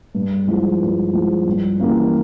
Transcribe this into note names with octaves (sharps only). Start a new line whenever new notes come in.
G2
F3 G#3 E4
G2
F3 G#3 E4
G2
E3 G3 A#3 C#4